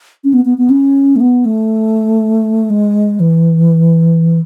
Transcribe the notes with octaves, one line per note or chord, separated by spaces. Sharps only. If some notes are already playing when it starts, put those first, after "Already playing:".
C#4
B3
B3
B3
C#4
A3
B3
A3
G#3
E3